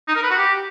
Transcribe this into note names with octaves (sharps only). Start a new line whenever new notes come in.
D#4
A#4
B4
F#4
G4